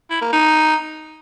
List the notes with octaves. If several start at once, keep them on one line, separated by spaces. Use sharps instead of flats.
E4
A#3
D#4